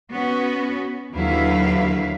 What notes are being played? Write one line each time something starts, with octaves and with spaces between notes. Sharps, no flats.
B3 C#4 F#4
D#2 D3 F#3 E4 B4 F5